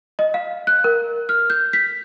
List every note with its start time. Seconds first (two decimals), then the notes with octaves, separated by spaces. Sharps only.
0.19 D#5
0.34 F5
0.67 F#6
0.84 A#4
1.29 F6
1.50 G6
1.73 B6